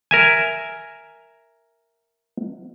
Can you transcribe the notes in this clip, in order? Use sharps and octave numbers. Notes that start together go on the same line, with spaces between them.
A#4 E5 G#5